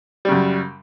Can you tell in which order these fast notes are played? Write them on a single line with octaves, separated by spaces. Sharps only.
G3 C#3 F#2